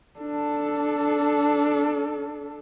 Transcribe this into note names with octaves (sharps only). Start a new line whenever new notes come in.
D4 A4